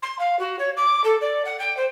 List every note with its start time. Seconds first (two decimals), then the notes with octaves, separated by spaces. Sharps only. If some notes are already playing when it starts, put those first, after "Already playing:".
0.02 C6
0.18 F5
0.39 F#4
0.59 C#5
0.76 D6
1.04 A4
1.21 D5
1.45 F#5
1.59 G5
1.77 C5